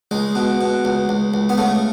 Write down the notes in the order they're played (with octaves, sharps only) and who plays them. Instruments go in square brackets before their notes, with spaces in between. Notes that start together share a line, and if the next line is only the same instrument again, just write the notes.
[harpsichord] C#2 G#3
B2
B2
C#2
C#2
C#2
B3
C#3 A3